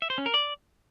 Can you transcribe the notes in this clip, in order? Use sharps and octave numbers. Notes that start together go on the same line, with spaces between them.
E5
C5
C#4
A#4
D5